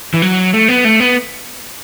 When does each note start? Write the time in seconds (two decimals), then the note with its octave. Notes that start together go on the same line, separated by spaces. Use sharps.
0.14 E3
0.22 F#3
0.53 A3
0.68 B3
0.85 A3
1.00 B3